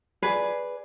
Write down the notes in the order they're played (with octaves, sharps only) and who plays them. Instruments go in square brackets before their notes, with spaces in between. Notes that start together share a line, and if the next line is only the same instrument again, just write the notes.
[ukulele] G#4 B4 D5